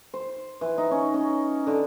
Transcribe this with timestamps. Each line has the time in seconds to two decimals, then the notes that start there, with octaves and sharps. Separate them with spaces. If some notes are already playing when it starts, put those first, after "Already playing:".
0.14 C5
0.61 E3
0.78 D#4
0.91 C#4
1.14 C#4
1.67 D3